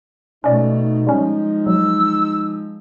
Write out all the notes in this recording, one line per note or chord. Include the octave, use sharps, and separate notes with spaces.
B2 A3 C#4 D#4 D5
F3 G3 G#3 C#4
F#3 E6